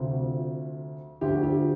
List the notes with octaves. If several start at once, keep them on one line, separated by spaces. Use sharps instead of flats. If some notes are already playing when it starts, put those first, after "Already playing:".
Already playing: D2 C3 F3
D2 D3 F3 G4
G4